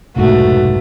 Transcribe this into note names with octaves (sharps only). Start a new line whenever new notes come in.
F1 B1 G#2 A3 B3 F#4